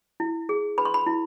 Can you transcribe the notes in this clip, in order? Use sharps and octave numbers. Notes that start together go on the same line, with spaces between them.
E4
G#4
B4 B5
C6
B5
E4